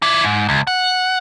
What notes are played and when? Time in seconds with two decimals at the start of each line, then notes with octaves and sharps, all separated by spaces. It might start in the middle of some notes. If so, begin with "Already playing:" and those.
0.02 E4 D5
0.24 G#2
0.49 C#2
0.67 F#5